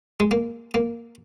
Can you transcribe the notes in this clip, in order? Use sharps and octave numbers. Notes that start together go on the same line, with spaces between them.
G#3
A#3
A#3